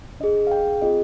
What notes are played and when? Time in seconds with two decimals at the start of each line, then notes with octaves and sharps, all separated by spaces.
0.20 D4 G#4 D#5
0.47 F5
0.52 G5
0.82 C4 F4 G#4 D#5